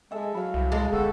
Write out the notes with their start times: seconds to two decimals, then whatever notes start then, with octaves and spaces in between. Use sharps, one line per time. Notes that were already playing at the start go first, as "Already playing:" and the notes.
0.11 G#3 A4 E5 G#5
0.34 F#3 F5 B5
0.54 C2
0.72 G#3 A4
0.93 G1 F#4 G4 A4